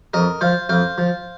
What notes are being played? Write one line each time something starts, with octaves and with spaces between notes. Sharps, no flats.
F2 A#4 D#5
F3 C5 F5
F2 C5 F5
F3